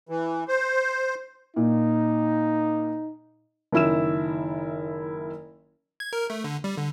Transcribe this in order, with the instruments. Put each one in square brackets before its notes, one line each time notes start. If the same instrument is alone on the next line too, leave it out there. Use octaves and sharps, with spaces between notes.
[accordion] E3
C5
[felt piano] A#2 [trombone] D#4
[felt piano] F#1 D#3 E4 E6 E7
[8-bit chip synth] G#6
A#4
A3
D3
G3
D3